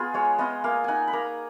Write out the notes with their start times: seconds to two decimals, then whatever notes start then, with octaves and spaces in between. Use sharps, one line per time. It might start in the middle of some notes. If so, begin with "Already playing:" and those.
Already playing: B3 F4 G#4
0.14 G#3 C#5
0.38 B3 F4 D#5
0.64 A#3 F5
0.84 D#4 F#5 G#5
1.08 B5
1.13 A#3 A#5